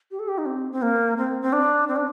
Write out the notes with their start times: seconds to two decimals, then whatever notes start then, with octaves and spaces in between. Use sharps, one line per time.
0.11 G4
0.19 A4
0.28 G4
0.38 D#4
0.46 C4
0.72 C4
0.82 A#3
1.18 C4
1.42 C4
1.53 D4
1.88 C4
1.96 D4